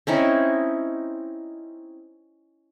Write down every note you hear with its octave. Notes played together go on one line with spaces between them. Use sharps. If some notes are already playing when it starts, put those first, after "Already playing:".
C4 C#4 D#4 E4